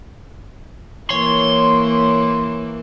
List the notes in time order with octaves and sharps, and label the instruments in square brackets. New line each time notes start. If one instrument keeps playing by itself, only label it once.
[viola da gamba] E3 A#3 [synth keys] C#5 [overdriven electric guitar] C6